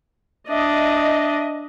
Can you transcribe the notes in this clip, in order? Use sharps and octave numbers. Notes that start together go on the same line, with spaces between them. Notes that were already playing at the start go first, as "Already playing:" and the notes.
D4 D#5 E5